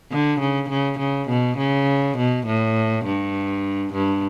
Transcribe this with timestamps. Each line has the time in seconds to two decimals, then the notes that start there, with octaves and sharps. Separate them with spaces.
0.12 D3
0.40 C#3
0.70 C#3
0.99 C#3
1.29 B2
1.58 C#3
2.17 B2
2.47 A2
3.05 G2
3.93 G2